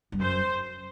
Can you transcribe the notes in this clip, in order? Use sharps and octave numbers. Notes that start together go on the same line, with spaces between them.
G2
F#2 C5